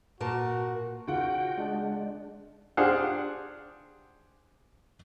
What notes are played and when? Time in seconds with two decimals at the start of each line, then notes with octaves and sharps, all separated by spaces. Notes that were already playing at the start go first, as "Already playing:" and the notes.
0.20 A#2 F#4 A#4 A5
1.08 C#3 F4 F#4 F#5 G5
1.58 G#3 D4
2.77 D4 G4 G#4 C5 F5 F#5